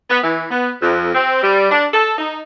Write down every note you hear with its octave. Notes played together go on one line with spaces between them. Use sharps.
B3
E3
B3
F2
C4
G3
D4
A4
D#4